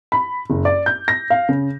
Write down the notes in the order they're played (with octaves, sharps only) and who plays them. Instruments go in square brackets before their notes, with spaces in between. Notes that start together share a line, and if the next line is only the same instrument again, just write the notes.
[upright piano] B5
F#1
D5
G6
A#6
F5
C#3